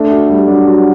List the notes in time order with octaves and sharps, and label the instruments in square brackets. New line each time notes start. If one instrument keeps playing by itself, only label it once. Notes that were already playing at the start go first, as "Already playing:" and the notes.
Already playing: [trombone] A3 [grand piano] D4
[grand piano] F#4
G3
[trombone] F#3 [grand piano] D4
[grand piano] F#4